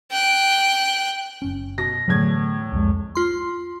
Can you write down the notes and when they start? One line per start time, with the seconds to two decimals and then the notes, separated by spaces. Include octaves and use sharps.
0.11 G5 F#6
1.42 F#1 C#4
1.78 B2 A#6
2.08 E2 A2 D3 F#3 G#6
2.72 C2 F2 G#3
3.15 F4 C6